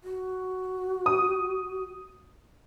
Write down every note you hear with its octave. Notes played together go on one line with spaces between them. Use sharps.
F#4
D#6